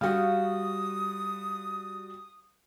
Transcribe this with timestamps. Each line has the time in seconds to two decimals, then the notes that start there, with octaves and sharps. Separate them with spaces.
0.01 G3 F#4 F5 G5 C#6 D#6